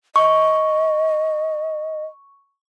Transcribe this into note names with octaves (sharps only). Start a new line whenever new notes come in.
D#5 C#6